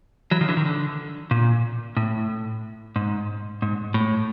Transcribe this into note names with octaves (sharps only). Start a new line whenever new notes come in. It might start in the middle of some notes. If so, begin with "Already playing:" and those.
E3 F#3
D#3 F3
D3 E3
D#3
D3
A#2
A2
G#2
G#2
A2